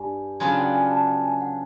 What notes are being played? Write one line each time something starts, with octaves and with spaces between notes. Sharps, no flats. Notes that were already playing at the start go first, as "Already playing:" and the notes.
Already playing: G2 G#5
C#3 F#3 B3 D4 F4 G#5
G5
G#5
A5
G5
G#5
F#5